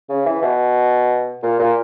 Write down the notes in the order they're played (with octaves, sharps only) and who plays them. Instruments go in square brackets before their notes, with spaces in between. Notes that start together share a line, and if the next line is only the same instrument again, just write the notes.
[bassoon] C#3
E3
B2
A#2
A#2